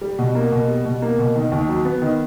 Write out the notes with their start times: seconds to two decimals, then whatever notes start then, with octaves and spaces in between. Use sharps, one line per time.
0.01 G3
0.19 B2
0.35 A#3
0.52 B2
0.68 G3
0.85 B2
1.02 A#3
1.19 B2
1.36 D#3
1.52 D#2
1.69 F#3
1.85 B3
2.02 D#3